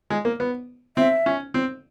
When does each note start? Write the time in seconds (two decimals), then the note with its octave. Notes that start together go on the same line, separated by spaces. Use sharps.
0.10 G#3
0.25 A#3
0.40 B3
0.97 C4 E5
1.26 C#4
1.54 C4